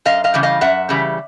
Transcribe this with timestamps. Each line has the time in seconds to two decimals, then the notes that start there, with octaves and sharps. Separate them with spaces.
0.05 F#2 D#5 F5
0.24 D#5 F5
0.34 C#3 E3 G3
0.43 D#5 F5
0.61 F#2 E5 F#5
0.89 C#3 E3 G3